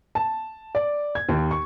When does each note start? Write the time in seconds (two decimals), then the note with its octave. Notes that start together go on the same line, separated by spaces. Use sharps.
0.15 A5
0.75 D5
1.15 G#6
1.29 D#2
1.51 C#6